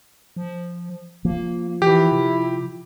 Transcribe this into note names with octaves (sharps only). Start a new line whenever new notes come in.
F3
F3 A#3
E3 E4 G4
C3